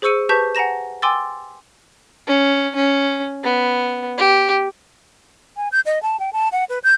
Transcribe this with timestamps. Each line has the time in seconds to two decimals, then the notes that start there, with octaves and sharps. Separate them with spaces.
0.02 G#4 C5 C#6 E6 C#7 D#7
0.29 G4 B4 A5 C#6 G6 B6
0.55 F#5 G#5 A#5 A#6 E7
1.02 G5 G#5 C6 D6 E6 A6
2.27 C#4
2.75 C#4
3.44 B3
4.18 G4
5.57 G#5
5.72 G6
5.86 D#5
6.03 A5
6.20 G5
6.33 A5
6.52 F#5
6.69 B4
6.84 G6